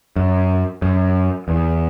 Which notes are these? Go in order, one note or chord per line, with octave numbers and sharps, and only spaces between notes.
F#2
F#2
E2